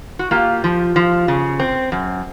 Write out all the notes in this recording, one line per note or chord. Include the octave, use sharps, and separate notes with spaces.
F#4
A#3 F4 G4
F3
F3
C#3
C4
F#2